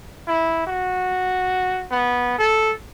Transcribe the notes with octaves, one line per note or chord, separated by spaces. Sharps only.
E4
F#4
B3
A4